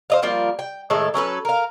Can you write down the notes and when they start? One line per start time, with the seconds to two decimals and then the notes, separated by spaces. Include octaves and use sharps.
0.10 C5 D#5 F5
0.22 F3 G3 A#3 F4
0.59 G5
0.90 A2 D#3 G#3 A4
1.14 F#3 C#4 A4 B4
1.45 A#4 F5